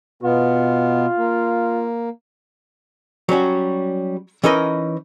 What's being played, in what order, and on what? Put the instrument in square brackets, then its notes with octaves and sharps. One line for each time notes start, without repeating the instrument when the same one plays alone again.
[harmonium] B2 B3 [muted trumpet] F4
[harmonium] A#3
[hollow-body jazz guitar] F#3 G3 C#4 F#4
E3 C#4 D#4 A#4 B4 D#5